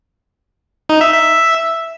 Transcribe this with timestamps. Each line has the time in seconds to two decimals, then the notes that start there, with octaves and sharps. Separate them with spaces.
0.89 D#4
1.01 E5
1.12 E5